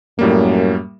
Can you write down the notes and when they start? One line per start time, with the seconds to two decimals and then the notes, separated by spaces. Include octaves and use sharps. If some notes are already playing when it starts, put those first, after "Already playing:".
0.19 F#2 A2 G3 A#3